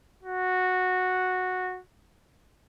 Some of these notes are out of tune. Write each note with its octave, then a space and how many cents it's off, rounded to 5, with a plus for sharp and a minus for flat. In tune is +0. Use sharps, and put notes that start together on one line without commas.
F#4 -10